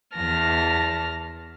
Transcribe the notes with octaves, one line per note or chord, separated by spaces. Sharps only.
E2 E3 A5 F6 A#6